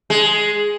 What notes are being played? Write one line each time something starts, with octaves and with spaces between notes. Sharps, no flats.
G#3